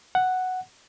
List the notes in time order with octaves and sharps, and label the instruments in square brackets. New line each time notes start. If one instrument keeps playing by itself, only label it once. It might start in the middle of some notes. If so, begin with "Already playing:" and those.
[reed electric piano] F#5